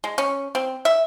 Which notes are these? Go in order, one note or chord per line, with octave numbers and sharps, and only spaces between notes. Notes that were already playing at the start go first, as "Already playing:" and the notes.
G#3
C#4
C4
E5